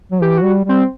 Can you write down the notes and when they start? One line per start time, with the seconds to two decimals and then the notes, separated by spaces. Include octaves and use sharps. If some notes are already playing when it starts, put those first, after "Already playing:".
0.11 F#3
0.22 E3 G4
0.38 F#4
0.43 G3
0.64 G3 C4